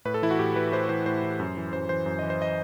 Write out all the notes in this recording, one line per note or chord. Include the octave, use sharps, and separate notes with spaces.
A2 B4
A4
E3 E4
F#4
A2 G4
E3 B4
A2 C5
E3 C5
A2 C5
E3
F#2
E3
F#2 C5
E3 C5
F#2
E3 D#5
C5
D#5